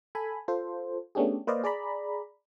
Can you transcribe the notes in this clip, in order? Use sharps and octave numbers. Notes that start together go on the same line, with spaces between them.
A4 G#5 B5
F4 A4 C5
A3 B3 C#4 D4 G4 G#4
A#3 B4 C5 D5 D#5 F5
G#4 D5 A#5 B5